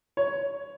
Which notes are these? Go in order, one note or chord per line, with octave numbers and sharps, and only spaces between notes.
C#5